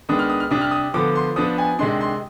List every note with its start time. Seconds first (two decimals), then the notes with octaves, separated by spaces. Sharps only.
0.09 D#3 G#3 B3 D4 D#6
0.19 F6
0.30 D#6
0.40 F6
0.51 C3 G3 D4 D#6
0.61 F6
0.71 D#6
0.94 D3 F3 B3 D6
1.15 C6
1.36 F3 B3 D4 D#6
1.58 G#5
1.79 C3 D#3 G#3 D4 C6
2.01 C6